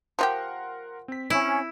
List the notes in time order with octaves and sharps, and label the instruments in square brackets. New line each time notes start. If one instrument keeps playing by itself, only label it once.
[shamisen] F3 F4 G4 [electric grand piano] A#4 F#5 C6
[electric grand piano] C4 B6
[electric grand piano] C4 [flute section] C#4 [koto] E4